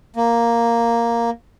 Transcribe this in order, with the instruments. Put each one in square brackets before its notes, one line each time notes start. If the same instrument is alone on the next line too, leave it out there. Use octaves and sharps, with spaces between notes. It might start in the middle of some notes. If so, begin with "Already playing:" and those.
[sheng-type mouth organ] A#3